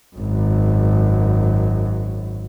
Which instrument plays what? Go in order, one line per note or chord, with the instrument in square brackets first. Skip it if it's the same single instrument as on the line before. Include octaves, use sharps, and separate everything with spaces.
[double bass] G#1 F#2